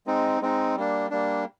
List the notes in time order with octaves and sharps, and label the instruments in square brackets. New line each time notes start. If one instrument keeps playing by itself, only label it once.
[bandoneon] G#3 C4 D#4
G#3 C4 D#4
G3 A#3 D4
G3 A#3 D4